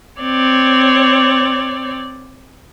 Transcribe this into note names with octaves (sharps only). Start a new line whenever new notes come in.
C4 C#5 D5